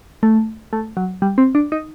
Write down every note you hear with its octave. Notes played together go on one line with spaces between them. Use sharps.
A3
A3
F#3
G3
C4
D4
D#4